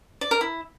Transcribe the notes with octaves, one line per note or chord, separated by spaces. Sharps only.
D5
A#4
E4